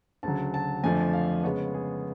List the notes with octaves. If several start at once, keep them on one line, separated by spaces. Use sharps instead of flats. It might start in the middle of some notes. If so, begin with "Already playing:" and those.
D2 C#3 F#3 A5
A5
F2 D3 F3 A3 D4 G#5
F5
C#3 G#3 B3 C#5
G#4